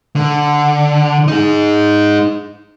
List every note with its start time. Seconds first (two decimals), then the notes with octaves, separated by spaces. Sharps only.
0.16 D3
1.28 D#4 G#4